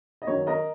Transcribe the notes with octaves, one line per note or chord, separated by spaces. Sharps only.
D#5
F#2 D#3 F#3 A#3 C#5
A#4 D#5